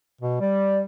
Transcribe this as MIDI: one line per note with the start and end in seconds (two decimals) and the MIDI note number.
0.21 0.36 47
0.41 0.85 55
0.41 0.80 74